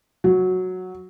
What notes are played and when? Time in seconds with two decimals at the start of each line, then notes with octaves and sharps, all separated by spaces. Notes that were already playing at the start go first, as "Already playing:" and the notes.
0.24 F#3